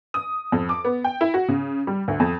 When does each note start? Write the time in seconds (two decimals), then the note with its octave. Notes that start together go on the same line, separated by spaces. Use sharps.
0.14 D#6
0.52 F2
0.69 D6
0.85 B3
1.04 G5
1.21 E4
1.34 F#4
1.48 C#3
1.87 G3
2.08 D2
2.20 F2